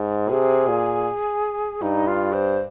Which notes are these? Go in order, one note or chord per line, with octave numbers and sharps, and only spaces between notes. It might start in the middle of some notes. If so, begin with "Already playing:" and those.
Already playing: G#2
C3 G#4
A#2
G2 D#4
F4
C5